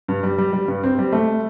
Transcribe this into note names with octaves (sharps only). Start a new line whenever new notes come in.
G2
G3
G3
G3
G2
C4
G3
A3